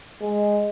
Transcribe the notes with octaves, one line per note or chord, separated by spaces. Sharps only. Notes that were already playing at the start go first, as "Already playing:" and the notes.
G#3